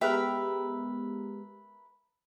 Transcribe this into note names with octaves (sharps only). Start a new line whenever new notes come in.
G#3 B3 G4 A#4 B4 E5